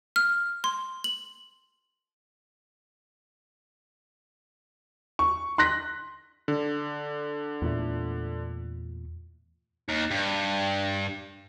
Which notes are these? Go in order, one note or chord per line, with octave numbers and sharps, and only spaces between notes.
F6
C6
F#7
C#6
C6 F#6 A#6 B6
D3
E2 A#2 A3
D#2
G2